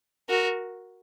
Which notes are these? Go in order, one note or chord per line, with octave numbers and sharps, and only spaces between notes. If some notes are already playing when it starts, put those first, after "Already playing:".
F#4 A#4